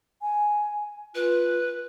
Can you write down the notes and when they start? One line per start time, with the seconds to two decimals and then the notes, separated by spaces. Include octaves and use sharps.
0.22 G#5
1.15 F4 B4